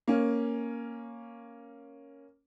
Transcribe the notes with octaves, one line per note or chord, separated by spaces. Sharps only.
A#3 C#4